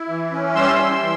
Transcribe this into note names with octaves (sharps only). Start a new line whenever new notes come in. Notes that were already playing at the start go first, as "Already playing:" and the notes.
Already playing: E4
E3
C#4
G3 C6 E6
E4
E3